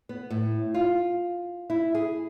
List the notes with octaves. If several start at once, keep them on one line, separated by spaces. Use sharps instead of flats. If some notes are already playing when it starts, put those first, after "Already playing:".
B3
A2
F4
E4
G#4